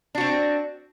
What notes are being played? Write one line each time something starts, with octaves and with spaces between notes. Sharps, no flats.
C4 D4 F#4